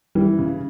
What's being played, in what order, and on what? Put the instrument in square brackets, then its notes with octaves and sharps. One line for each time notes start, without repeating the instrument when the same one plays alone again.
[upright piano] E3 [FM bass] G3
[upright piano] C#3